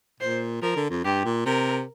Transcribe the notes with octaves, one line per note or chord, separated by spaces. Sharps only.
A#2 C5
F3 A#4
D3
F2
G2 G4
A#2
C3 A#4